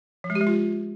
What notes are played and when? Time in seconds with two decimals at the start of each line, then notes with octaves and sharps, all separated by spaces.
0.24 F3
0.30 G#3
0.35 G4
0.41 G#3
0.47 F4